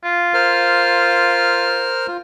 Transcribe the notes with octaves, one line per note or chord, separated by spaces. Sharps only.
F4
A#4 C5 F6
F4